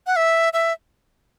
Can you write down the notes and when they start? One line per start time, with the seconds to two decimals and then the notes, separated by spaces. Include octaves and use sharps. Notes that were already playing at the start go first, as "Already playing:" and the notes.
0.07 F#5
0.16 E5
0.53 E5